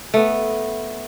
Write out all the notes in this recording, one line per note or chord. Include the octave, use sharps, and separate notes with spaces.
A3 B3